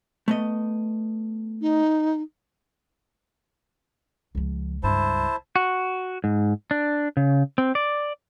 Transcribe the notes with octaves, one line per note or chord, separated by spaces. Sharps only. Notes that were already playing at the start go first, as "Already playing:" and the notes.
A3 B3 D#5
D#4
C#2 F3
C#2 G2 E4 C5 A5
F#4
G#2
D4
C#3
C4
D5